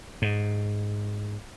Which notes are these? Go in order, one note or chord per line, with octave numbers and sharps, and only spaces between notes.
G#2